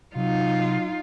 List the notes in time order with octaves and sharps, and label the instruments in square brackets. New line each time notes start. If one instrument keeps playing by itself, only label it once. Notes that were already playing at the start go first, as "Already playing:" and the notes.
[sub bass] C3 [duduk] F#3 [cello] D#4 F4